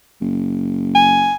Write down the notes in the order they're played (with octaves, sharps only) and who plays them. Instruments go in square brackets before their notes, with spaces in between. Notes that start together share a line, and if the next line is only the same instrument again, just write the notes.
[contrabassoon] F#1
[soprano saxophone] G#5